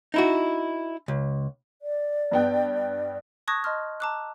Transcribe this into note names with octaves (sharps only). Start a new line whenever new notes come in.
D#4 E4 F#4
C#2
D5
G2 B3 G5
A5 C#6 D#6 F#6 G#6 A#6
D#5 A5 C6 F6
A5 A#5 D6 E6 F#6